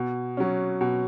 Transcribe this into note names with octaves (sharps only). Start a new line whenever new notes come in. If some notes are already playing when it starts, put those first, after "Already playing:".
Already playing: B2
F#3 C#4
B2